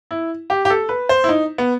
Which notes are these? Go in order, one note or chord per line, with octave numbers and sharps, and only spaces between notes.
E4
G4
G4
A4
B4
C5
E4
D#4
B3